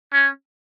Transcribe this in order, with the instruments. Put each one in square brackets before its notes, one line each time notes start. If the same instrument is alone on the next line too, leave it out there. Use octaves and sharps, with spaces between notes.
[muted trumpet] C#4